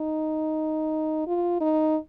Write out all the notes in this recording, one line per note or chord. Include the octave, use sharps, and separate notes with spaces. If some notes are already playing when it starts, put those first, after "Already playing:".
Already playing: D#4
F4
D#4